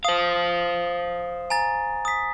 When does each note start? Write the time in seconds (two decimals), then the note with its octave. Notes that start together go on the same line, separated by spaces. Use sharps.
0.05 C5 F5 D#6
1.50 G#5 A#5 A6
2.05 D#6 B6